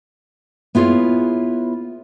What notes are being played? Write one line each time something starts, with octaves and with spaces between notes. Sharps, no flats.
B3 E4 F4 G#4 C#5